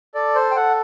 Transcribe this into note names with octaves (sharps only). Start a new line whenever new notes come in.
A4 D5
C5
G5
A4 F#5